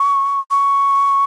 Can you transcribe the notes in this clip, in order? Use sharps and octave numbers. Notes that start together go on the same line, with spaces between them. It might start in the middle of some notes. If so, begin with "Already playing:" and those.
Already playing: C#6
C#6